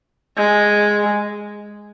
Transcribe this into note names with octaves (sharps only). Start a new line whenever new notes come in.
G#3